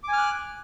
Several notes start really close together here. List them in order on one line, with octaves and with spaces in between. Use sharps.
D6 G#5 F6 F#6